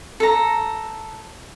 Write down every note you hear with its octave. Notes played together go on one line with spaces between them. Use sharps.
A4 A#5